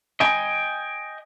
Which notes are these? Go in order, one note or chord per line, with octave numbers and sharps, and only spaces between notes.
D#5 G5 G#5